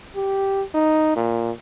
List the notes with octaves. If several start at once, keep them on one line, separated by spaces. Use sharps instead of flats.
G4
D#4
A#2